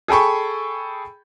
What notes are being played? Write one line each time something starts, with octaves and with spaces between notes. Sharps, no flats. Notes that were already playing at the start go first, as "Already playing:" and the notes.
G#4 A4 G5 B5 C#6